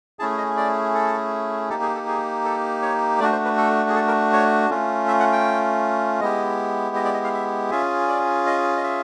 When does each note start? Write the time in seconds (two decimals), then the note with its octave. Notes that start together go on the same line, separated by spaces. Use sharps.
0.19 A3 C#4 E4 G#4 A5
0.38 D#5
0.57 D5
0.94 A4
1.70 A#3 D#4 G4 A4
1.82 G#4
1.95 A4
2.07 G#4
2.44 A4
2.82 C#5
3.20 A3 D4 F#4 D5
3.32 C5
3.45 B4
3.57 A4
3.89 G#4
3.95 A4
4.08 A#4
4.33 C#5
4.70 A3 C#4 F4
5.08 E5
5.20 F#5
5.32 G5
6.21 G#3 B3 E4 G4 D#5
6.96 D#5
7.05 D5
7.14 D#5
7.24 F5
7.33 E5
7.71 C#4 F4 G#4 E5
8.08 D5
8.46 D#5
8.77 D#5
8.84 E5